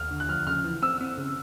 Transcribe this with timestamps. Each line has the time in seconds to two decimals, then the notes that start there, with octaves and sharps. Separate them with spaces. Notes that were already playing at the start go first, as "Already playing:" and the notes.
Already playing: D#2 F6
0.11 D3
0.20 F#6
0.28 F3 F6
0.47 C#3 F6
0.64 E3
0.82 C4 E6
1.01 C4
1.18 C#3